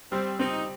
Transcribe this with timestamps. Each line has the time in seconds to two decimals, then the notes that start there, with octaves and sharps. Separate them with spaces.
0.12 G3 C4
0.39 C4 D#4